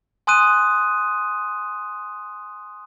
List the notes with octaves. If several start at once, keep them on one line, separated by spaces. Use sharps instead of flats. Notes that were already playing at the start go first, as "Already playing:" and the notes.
G#5 C6 D#6 F#6 D#7